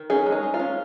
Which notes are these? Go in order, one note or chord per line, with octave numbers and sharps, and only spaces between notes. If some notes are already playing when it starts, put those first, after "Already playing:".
Already playing: D#3
C#4 D#4 G#4
G#3
D#4
G#3
F4
C#4